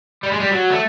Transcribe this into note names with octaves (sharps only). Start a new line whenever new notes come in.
G3
G#3
G3
F#3
A3